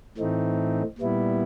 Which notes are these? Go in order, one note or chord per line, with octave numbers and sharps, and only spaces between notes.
A2 E3 A3 C4 D#4
A#2 G3 B3 E4